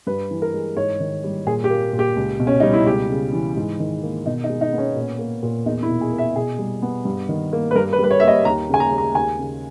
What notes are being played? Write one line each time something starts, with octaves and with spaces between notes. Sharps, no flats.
G2 B4
E3
A#4
G#3
G#2 C#5
D#3
G3
A#2 G#4
G4
A#3
A#2
G4
C#2
B2
C#4
G3 D#4
E4
C#2 G4
C#3
E3
G#2
D#3
A#3
B2 D#4
D#4
G#3
D#4
B3
C#4
A#2
A#3
A#2
E2 D#4
E4
B2
G#4
A#3
E5
B2 G#4
G3
B3
G2
D#3
A#3
B4
G2 A#4
B4
G3
B4
C#5
A#3 E5
D#5
D#2 A#5
C#3 G#5
A#5
G#3
A#5
D#2 G#5
C#3